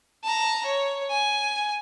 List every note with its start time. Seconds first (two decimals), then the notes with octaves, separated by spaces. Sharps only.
0.24 A5 A#5
0.66 C#5
1.10 G#5